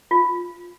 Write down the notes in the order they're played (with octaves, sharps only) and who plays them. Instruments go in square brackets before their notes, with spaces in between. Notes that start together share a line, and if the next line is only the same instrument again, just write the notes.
[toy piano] F4